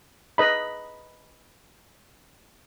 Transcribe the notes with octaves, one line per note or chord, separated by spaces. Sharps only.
B4 D#5 B5